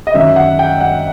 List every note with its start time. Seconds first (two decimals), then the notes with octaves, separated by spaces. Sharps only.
0.07 D#5
0.14 F#2 D#3 F#3 E5
0.36 F#5
0.59 G5
0.81 F#5